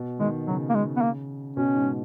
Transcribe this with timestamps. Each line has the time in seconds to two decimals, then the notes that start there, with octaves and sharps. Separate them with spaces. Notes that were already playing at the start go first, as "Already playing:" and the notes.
Already playing: B2
0.20 D#3 G#3
0.47 C#3 F#3
0.69 A#3
0.74 G#3
0.97 B3
1.02 A#3
1.56 B2 C#4
1.75 G#2